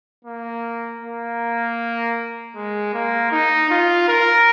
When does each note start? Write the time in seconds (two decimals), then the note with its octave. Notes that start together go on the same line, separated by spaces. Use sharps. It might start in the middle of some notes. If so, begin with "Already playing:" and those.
0.25 A#3
1.02 A#3
2.55 G#3
2.94 A#3
3.32 D#4
3.70 F4
4.09 A#4